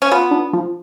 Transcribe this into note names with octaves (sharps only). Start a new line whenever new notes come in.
C#4
B3 F4
D4
F3